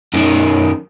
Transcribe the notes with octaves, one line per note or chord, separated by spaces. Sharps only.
F#2 D#3